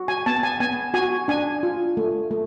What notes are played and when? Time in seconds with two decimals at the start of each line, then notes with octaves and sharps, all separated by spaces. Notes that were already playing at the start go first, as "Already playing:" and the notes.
Already playing: F#4
0.08 G#5
0.26 B3 A5
0.43 G#5
0.60 B3 G#5
0.94 F#4 G#5
1.28 D4 G#5
1.63 F4
1.97 A3
2.31 A3